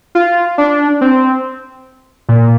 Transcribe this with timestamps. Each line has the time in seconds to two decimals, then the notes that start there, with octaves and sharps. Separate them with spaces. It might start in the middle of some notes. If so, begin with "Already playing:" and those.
0.15 F4
0.58 D4
1.01 C4
2.29 A#2